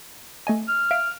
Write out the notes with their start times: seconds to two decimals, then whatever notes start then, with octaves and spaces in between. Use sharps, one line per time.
0.47 A3 D#5 G#5
0.68 F6
0.91 E5 F5 D7